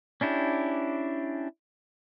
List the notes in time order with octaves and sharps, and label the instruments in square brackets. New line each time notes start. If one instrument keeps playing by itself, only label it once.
[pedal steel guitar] C#4 D4 E4 G4